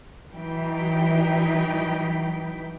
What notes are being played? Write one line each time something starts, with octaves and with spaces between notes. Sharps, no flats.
E3 F#3 D#4 G5 B6